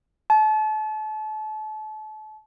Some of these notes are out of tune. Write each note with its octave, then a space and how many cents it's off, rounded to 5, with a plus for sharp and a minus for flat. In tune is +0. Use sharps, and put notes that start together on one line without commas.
A5 -35